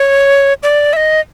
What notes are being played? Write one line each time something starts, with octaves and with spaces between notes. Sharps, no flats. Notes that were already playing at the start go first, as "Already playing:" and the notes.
Already playing: C#5
D5
E5
D#5